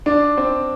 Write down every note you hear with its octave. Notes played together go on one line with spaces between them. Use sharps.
D4
C4